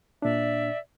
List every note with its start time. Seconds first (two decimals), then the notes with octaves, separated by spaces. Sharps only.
0.22 A#2 D4 D5 E5